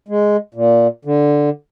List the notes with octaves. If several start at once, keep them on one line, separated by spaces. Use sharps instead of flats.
G#3
A#2
D3